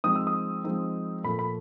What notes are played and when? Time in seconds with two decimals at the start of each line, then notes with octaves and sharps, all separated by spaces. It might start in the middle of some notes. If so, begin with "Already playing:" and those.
0.04 F3 G#3 C4 D#4 D#6
0.15 E6
0.27 D#6
0.64 F3 G#3 C4 D#4
1.24 A#2 F3 A3 B5
1.39 B5